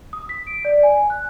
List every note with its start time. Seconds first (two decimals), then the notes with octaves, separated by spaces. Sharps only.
0.13 D#6
0.29 B6
0.47 D7
0.65 D5
0.83 G#5
1.10 F#6